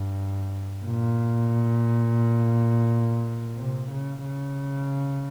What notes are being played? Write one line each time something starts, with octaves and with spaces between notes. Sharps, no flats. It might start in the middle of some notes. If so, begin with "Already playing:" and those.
Already playing: G2
A#2
C3
C#3
C#3